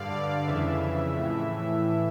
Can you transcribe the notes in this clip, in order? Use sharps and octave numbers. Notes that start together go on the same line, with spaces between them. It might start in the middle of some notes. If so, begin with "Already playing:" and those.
Already playing: G2 D3 D5 F5
D5 F5
F2 C#3 E3 E5
A2 E3